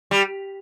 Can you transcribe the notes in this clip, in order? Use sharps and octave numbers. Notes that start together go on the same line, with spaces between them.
G3